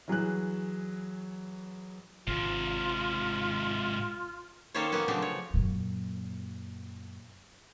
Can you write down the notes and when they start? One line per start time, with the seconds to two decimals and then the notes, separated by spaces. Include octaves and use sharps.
0.08 E3 F#3 G#4 F#6
2.27 G#1 G#2 C3 F4
4.74 D#3 A#3 C#4 A4 C5 C#5
4.92 A#3 B3 C#4 F#4
5.08 C#3 F3 F#3 A3 C4 D4
5.22 C#5
5.54 F#2 A#2